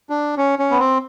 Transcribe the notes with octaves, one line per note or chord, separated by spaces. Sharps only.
D4
C#4
C#4
B3
C4